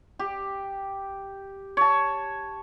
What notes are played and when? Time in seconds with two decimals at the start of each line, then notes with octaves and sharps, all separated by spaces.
0.19 G4
1.77 C#5 A5